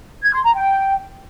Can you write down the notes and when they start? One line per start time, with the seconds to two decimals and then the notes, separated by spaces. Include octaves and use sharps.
0.24 G#6
0.34 C6
0.44 A#5
0.55 G5